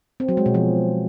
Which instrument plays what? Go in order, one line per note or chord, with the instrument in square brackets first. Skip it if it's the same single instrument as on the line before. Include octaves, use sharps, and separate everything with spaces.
[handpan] C4
F#3
G#3
B2
F3